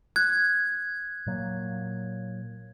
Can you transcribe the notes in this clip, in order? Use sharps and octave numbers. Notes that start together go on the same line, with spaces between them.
F#6 G#6
A#2 F#3 A#3